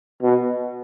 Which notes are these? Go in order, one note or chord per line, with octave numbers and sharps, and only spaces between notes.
B2